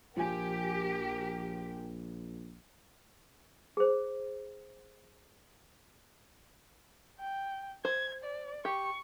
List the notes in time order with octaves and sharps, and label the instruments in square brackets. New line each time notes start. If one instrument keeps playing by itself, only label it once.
[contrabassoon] A#1 [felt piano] F3 G#5 [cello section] G4 [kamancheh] A#4 G5
[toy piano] G#4 C5
[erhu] G5
[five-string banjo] C5 [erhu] G#6
[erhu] D5
[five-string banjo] G4 [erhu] C#6